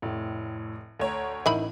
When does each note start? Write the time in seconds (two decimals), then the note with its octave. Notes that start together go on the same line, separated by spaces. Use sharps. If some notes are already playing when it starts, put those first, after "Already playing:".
0.02 F1 A2
0.99 D2 A4 C#5 A#5
1.46 A1 D#3 E4 B5 D#7